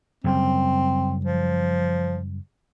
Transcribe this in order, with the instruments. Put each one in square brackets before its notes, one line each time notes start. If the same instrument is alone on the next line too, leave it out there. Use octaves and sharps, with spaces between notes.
[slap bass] F#2 C#3 G3 [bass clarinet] C4
[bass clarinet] F3